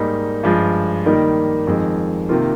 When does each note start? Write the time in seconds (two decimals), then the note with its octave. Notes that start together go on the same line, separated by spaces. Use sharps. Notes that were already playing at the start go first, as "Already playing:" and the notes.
Already playing: G#2 G3 A#3 D#4
0.43 G2 F3 G#3
1.05 D#3 G3 A#3 D#4
1.67 F2 D#3 G#3
2.29 C3 D#3 A#3 F4